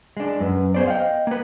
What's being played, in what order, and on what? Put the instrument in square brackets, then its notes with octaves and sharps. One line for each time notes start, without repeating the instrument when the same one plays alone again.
[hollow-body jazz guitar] G#3 D4
[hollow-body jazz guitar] F#2 [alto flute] B4
[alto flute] B3 [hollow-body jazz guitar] G#4 C5 D5
[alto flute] D#5 [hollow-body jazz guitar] F5 G5
[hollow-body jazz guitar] A#3 B4